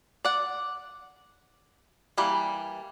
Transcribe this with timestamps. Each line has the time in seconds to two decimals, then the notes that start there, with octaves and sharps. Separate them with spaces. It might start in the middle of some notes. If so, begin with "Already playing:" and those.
0.25 D5 F#5
2.18 E3 G3 A#3